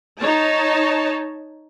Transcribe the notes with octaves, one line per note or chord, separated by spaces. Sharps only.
D#4 C#5 A5